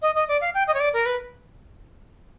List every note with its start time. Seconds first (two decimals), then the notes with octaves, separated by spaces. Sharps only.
0.02 D#5
0.15 D#5
0.28 D5
0.41 F5
0.54 G5
0.67 D#5
0.74 C#5
0.80 D5
0.93 A#4
1.06 B4